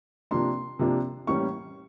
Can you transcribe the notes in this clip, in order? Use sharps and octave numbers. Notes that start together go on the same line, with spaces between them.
C3 F3 A#3 D4 C6
C3 F3 A#3 D4
A2 E3 G3 A#3 C#4 C#6